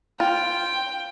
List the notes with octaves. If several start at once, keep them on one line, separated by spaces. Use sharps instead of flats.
F4 G5